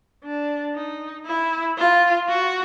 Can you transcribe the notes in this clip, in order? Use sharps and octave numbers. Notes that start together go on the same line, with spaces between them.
D4
D#4
E4
F4
F#4